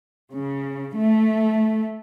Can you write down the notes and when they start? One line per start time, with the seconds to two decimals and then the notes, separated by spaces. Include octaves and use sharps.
0.33 C#3
0.96 A3